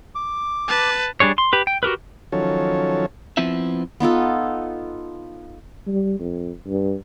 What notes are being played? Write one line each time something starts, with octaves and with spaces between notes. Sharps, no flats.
D6
B4 A5
G3 D4 G#4 C#5
C6
G4 B4
G5
F#4 G4 A#4 B4
D#3 F3 F#3 C#4 A4 C#5
F3 B3 C4 E4 E5
B3 D#4 F4 A4
G3
F2
G2